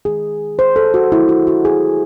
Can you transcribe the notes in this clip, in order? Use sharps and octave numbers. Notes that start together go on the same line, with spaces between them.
D#3 G#3 G#4
C5
A4
F#4
D#3 F#3 A3 E4
F#4
F#4
G#4